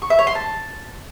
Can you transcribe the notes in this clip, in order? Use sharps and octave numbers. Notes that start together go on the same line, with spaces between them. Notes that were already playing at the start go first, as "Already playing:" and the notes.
C#6
E5
C#5
C6
A5